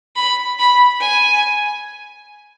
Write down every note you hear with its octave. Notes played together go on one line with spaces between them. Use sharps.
B5
B5
G#5